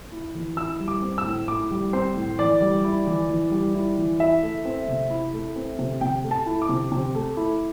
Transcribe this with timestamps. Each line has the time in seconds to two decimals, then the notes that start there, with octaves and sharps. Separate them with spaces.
0.12 E4
0.35 E3
0.57 E4 E6
0.80 G3
0.88 D6
1.02 C4
1.18 E6
1.25 A2
1.48 E4 D6
1.71 G3
1.93 C4 C5
2.16 A2
2.39 E3 D5
2.61 G3
2.84 E4
3.07 E3
3.29 E3
3.51 G3
3.75 E4
3.98 E3
4.20 E4 E5
4.42 A3
4.65 C4
4.88 C3
5.10 E4
5.33 A3
5.56 C4
5.79 C3
6.01 C3 G5
6.24 A3
6.31 A5
6.46 E4
6.62 D6
6.69 C3
6.92 C3
7.15 A3
7.37 E4